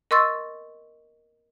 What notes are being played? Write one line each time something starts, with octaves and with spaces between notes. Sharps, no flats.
A#4 D#5 C6 C#6 E6 A6